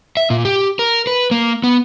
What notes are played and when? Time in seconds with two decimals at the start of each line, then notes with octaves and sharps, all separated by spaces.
0.17 E5
0.30 A#2
0.45 G4
0.79 A#4
1.07 B4
1.31 A#3
1.64 B3